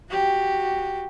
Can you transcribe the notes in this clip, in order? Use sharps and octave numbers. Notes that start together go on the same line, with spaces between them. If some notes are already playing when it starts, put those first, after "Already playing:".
F#4 G4